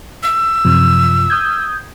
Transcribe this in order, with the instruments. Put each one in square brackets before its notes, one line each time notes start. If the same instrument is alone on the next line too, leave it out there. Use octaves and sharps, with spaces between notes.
[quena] E6
[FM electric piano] F#2 C3 F3
D#6 G6 G#6